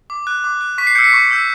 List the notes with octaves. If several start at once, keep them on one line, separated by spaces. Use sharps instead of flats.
D6
F#6
D6
F#6
C#6 B6
C7
E6 G6 C#7
B6
C#6
E6 G6